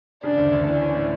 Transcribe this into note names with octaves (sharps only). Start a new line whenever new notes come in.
C#3 D4
D2
D2
E3 D4
C#4
A2